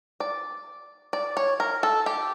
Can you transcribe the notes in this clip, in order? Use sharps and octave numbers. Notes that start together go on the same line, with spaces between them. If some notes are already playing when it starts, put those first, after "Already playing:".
D5
D5
C#5
A#4
A4
G4